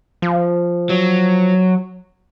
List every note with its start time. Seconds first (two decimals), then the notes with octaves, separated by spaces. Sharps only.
0.22 F3
0.89 F#3